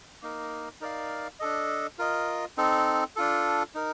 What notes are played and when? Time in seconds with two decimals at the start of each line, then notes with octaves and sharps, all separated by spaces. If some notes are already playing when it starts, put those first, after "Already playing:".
0.22 A#3 D#4 A#4
0.81 D#4 A#4 D5 F5
1.40 D4 A4 D#5
1.99 F4 A#4 D#5
2.57 C4 D#4 A4
3.16 D4 F4 A4
3.75 D#4 A#4